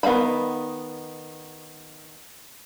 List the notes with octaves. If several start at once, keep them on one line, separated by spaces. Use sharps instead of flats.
D#3 B3 F5 A5 B5